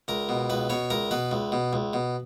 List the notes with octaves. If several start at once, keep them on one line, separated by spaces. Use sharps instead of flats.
C#2 A#4
B2
C#2 B4
B2 C#5
C#2 A#4
B2 B4
C#2
B2
C#2
B2